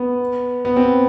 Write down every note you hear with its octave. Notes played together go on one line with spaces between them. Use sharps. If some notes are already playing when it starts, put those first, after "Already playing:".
Already playing: B3
B3
C4